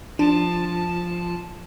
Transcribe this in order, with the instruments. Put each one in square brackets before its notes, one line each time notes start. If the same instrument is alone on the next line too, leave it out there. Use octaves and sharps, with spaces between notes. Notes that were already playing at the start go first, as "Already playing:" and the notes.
[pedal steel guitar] F3 [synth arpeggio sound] D4 [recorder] A5